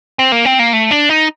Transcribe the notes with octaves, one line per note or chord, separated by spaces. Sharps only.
C4
A#3
C4
A#3
A3
D4
D#4